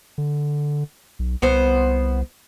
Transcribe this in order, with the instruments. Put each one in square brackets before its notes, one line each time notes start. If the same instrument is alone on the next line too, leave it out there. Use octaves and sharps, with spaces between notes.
[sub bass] D3
B1
[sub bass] C2 [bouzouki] B3 C5